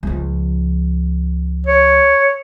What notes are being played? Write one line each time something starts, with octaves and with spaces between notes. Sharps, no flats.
C#2 F3
C#5